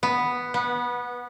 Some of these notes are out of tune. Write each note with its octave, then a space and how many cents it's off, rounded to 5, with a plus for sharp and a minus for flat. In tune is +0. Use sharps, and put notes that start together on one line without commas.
B3 +0
B3 -20